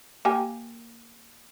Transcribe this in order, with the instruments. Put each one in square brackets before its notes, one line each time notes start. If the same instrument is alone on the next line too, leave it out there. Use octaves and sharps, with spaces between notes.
[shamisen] A#3 G4 G#5